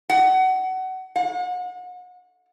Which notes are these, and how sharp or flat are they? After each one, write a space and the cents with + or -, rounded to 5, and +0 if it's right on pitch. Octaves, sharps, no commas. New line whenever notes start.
F#5 +25
F#5 -35